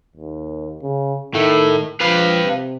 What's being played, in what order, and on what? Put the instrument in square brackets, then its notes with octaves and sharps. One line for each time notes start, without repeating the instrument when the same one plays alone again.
[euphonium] D#2
C#3
[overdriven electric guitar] A2 A3 [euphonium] D#3
[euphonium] F3 [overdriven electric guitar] B4 F5
[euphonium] C3